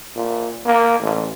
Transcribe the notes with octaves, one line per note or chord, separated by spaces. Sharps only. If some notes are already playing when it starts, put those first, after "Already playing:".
A#2
A#3
A1